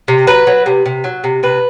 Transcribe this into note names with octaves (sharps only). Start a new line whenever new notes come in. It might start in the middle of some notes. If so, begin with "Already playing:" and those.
C3
F#3 B4
F#3
C3
C3
F#3
C3
C3 B4